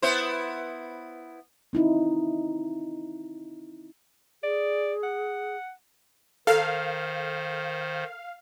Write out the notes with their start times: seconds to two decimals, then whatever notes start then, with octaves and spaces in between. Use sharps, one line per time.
0.02 B3 E4 C5
1.73 C4 D#4 E4
4.43 G#4 D5
5.03 F#5
6.47 D#3 A4 A#4 C5 F5